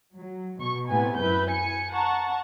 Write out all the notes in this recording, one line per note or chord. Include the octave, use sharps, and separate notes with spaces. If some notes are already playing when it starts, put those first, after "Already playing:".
F#3
B2 C#6
A2 C3 B3 G#5
F#2 E4 B4 G6
G#5 C#7
F#5 A5 A#5 C#6